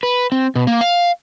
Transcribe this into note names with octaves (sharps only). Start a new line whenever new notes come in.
B4
C4
B2
A#3
F5